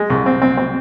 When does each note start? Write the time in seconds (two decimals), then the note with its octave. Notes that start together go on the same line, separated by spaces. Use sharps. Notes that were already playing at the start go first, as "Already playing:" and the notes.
Already playing: G#3
0.10 C2
0.26 C4
0.42 C4
0.57 C4